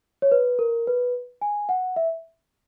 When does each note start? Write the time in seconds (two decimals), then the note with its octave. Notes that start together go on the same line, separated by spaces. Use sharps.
0.22 C#5
0.32 B4
0.59 A#4
0.87 B4
1.41 G#5
1.69 F#5
1.96 E5